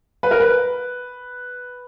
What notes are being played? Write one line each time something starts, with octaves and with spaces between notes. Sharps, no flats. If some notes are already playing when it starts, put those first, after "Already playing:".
B4
A#4
B4